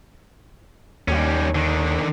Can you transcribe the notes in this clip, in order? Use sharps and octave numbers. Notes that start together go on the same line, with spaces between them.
D#2 G3 C#4
D3 D#3